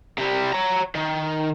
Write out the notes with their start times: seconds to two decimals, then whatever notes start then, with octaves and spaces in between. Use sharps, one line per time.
0.18 C3 G3
0.53 C#5 A#5
0.95 D#3